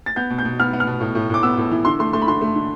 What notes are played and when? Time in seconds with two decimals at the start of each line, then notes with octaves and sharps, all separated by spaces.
0.06 A6
0.16 B3 G6
0.30 B2
0.38 G6
0.45 B2
0.59 B3 F6
0.73 B3
0.80 F6
0.87 B2
1.00 A2
1.15 A2
1.30 A2 D6
1.43 B3 E6
1.57 A2
1.71 E3
1.85 D3 C6
1.99 A3 C6
2.13 A3 C6
2.22 B5
2.27 D3 C6
2.41 A3
2.55 D3